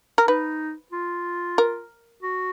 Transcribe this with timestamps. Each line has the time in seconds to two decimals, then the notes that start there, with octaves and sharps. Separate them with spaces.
0.18 A#4
0.28 D#4 B4
0.92 F4
1.58 A#4
2.23 F#4